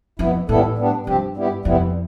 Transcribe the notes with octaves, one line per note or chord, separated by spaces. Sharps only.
F2 B2 B3 E4
A2 E3 G3 B3 E4 A4
G3 B3 D4
G2 C3 F3 C4 G4
G3 B3 E4 G4
F2 C3 G3 B3 E4